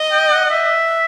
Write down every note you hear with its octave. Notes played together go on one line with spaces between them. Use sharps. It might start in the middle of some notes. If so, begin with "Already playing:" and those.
Already playing: D#5
G5
F#5
E5